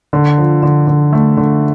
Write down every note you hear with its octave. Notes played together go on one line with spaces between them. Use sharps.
D3
F3
D3
D3
A3
D3